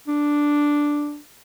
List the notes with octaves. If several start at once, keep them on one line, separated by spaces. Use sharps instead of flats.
D4